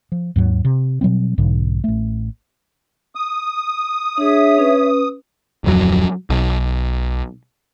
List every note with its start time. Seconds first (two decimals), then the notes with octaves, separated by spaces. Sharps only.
0.12 F3
0.36 D#2 G#2 F#3
0.65 C3
1.01 B2 F#3 G3 C4
1.38 B1 G#2 D3
1.84 A1 A3
3.15 D#6
4.18 D4 G#4 C#5 E5
4.58 C#4 B4
5.64 D1 F2 F#3
6.30 B1